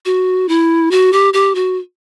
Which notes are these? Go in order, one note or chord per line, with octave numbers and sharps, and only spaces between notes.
F#4
E4
F#4
G4
G4
F#4